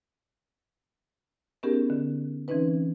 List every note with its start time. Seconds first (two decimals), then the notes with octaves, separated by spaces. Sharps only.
1.63 B3 C#4 D#4 G4 G#4 A#4
1.90 D3
2.48 E3 C4 C#4 D#4 B4